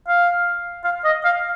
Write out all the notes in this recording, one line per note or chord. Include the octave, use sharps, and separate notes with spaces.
F5
F5
D#5
F5